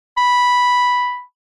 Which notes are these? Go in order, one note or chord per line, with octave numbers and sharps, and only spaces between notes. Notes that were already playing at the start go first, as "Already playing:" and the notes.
B5